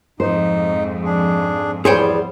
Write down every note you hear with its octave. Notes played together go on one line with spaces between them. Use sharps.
F2 G#2 D#4 C5
D4 G#4
E2 G3 B3 G#4 C5 C#5 G5